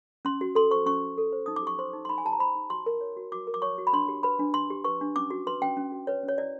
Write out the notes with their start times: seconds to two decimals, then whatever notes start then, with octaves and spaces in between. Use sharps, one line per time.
0.25 C#4 C6
0.41 F#4
0.55 A4 C6
0.71 C5 C#6
0.86 C#4 C#6
1.01 F#4
1.18 A4
1.32 C5
1.46 D#4 D#6
1.56 D6
1.62 G4 C#6
1.79 C5 C6
1.93 D#4
2.05 C6
2.09 D#4 B5
2.18 G#5
2.25 G4 A5
2.33 A#5
2.39 C5 B5
2.55 D#4
2.70 F#4 C6
2.86 A#4
3.01 C#5
3.17 F#4
3.32 F#4 D6
3.47 A#4
3.54 D6
3.62 C#5 C#6
3.78 F#4
3.87 B5
3.93 D4 C6
4.08 G4
4.23 B4 B5
4.39 D4
4.54 D4 C6
4.70 G4
4.84 B4 C#6
5.01 D4
5.16 C#4 D6
5.30 F#4
5.47 B4 C6
5.62 C#4 G5
5.77 C#4
5.92 F#4
6.07 B4 C#5
6.23 C#4
6.28 C#5
6.38 E4 D5